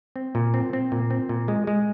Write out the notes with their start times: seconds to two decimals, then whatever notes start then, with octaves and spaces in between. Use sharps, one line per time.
0.16 C4
0.35 A#2
0.54 C4
0.73 C4
0.92 A#2
1.10 C4
1.29 A#2
1.48 G#3
1.67 G#3